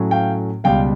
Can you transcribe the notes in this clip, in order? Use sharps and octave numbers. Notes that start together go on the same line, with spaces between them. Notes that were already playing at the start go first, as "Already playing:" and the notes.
Already playing: A2 F#3 A3 C#4
F5 G5
C#2 B2 G3 F5 G5